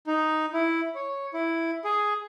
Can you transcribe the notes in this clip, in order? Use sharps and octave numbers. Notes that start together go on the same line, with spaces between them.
D#4
E4
C#5
E4
G#4